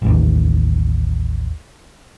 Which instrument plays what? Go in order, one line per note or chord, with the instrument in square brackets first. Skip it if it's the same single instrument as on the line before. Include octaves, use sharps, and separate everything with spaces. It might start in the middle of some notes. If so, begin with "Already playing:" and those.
[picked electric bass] A1 D#2